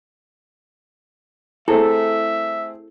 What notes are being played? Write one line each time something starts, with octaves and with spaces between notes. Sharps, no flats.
A3 C4 E4 G#4 A4 E5